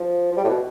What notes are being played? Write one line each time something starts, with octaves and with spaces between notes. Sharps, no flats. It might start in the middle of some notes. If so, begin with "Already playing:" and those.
Already playing: F3
F3
G3
A2
B2